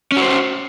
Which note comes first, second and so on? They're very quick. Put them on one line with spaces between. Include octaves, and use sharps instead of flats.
C#4 F#4 C5